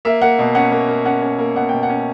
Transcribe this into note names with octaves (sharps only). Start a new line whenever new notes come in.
A#3 E5
A#3 F#5
B2
C#4 F#5
A#3
A#3
C#4 F#5
C#4
A#3
B2 F#5
B2 G5
F#5
C#4